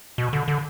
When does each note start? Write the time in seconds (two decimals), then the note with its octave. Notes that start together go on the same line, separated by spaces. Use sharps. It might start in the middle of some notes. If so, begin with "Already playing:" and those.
0.18 B2
0.33 D3
0.48 D3